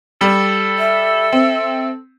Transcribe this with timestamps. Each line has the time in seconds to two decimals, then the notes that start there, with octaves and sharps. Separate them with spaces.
0.21 G3 A4
0.78 E5
1.33 C4